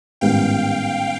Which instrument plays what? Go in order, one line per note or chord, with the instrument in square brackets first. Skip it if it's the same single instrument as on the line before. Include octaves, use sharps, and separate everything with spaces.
[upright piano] A1 G#2 D#3 G3 B3 [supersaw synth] F5 G5